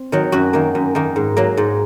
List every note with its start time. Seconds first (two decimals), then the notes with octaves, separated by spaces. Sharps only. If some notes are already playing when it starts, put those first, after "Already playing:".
Already playing: C4
0.12 D#3 F#3
0.32 F#2 F#4
0.53 D#3 A#3
0.75 F#2
0.95 D#3 A#3
1.16 G#2
1.37 F#3 A#3
1.57 G#2